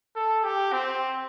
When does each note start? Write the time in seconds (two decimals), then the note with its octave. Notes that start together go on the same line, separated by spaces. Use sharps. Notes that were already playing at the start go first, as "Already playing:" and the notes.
0.16 A4
0.44 G4
0.73 C4